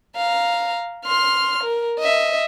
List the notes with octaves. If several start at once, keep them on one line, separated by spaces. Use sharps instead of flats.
F5 A#5
C6 F6
A#4
D#5 E5